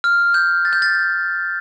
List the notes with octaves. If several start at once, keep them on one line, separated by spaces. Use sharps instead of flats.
F6
G6
A6
G6
A6